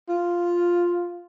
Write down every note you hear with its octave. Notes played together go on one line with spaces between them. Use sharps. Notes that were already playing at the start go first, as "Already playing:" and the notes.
F4